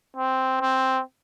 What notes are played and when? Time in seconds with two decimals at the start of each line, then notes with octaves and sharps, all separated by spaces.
0.16 C4
0.61 C4